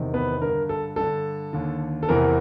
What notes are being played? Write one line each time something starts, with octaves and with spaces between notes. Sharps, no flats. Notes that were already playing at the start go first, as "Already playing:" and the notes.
Already playing: E2 C3 D#3
B3 B4
G2 D3 A#4
A4
G2 D3 A4
D#2 D3
A4
E2 C3 E3 A#4